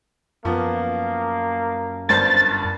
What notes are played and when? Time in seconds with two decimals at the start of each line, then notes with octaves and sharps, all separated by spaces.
0.45 F#2 F3 A#3 B3
2.09 G1 G2 A#4 C5 A6